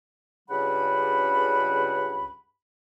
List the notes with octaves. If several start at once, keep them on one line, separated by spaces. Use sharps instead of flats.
C#2 G2 C#3 G3 F#5 B5